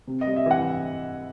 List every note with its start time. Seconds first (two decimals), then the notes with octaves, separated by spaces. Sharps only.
0.07 C3
0.21 D#5
0.26 G3
0.36 E5
0.46 E3 F#5